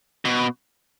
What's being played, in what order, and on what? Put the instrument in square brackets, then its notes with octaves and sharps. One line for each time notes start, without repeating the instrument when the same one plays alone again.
[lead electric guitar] B2